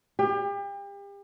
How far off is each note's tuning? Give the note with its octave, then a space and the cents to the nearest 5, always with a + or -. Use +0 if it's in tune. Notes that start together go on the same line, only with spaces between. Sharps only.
G4 +35